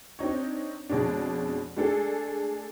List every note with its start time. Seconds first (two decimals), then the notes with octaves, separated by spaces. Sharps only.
0.19 C4 D4 D#4 C#5
0.89 F2 B2 G#3 C#4 D4
1.76 G#3 A3 D4 G#4 A4